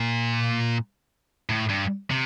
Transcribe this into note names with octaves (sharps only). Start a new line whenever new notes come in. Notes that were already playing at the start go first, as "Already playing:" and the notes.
Already playing: A#2
A2
G2
C3